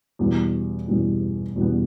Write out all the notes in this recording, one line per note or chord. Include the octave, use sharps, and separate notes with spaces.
E2 B2 G3 B3
E2 B2 G3 B3
E2 B2 G3 B3